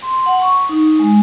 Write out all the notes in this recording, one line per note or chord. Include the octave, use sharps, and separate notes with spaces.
C6
F#5
C#6
D#4
G#3